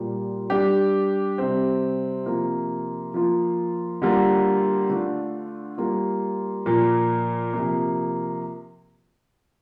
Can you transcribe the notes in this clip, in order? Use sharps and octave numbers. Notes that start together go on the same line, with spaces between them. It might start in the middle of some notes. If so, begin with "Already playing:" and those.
Already playing: A#2 G3 A#3 F4
G3 D4 G4
C3 G3 C4
C3 F3 A#3 F4
F3 A#3 F4
D3 G3 A#3 F4
D3 A3 D4 F4
G3 A#3 F4
A#2 F3 A#3
C3 F3 A#3